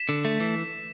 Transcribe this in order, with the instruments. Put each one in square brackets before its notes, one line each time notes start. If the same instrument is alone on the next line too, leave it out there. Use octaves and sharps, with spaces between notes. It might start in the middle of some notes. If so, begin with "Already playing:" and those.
Already playing: [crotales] B6 E7
[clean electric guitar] D3
A3
E3